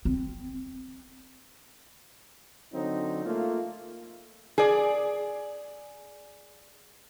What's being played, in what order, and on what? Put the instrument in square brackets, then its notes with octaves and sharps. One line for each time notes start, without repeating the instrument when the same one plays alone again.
[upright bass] C4
[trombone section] D3 F#3 C4 D#4
A3 A#3 F4
[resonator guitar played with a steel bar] G#4 D5